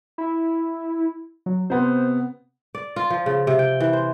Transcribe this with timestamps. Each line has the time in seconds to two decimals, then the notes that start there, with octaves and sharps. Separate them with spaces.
0.18 E4
1.46 F#3
1.70 C3 B3 C5
2.75 D5
2.96 F4
3.10 F3
3.26 C#3
3.47 C3
3.59 G5
3.80 E3
3.93 C5